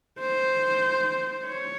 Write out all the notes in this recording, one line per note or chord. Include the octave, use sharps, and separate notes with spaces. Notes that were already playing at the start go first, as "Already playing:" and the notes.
C5
C#5